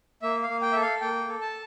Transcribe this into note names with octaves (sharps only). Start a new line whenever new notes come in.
A#3 E5
F5
A#3
G5
A4 E5
F5
A#3 G5
A4
A5